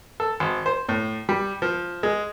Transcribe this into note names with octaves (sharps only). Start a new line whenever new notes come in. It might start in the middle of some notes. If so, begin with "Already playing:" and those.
A4
G#1
C5
A2
G3
F3
G#3